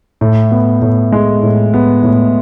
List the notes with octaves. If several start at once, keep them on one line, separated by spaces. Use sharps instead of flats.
A2
B3
A2
G#3
A2
B3
A2